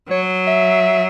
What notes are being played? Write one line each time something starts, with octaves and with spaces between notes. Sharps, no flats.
F#3 C#5
E5